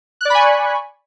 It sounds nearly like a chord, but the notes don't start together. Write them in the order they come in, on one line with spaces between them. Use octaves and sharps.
F#6 D5 B5 G#5 C#6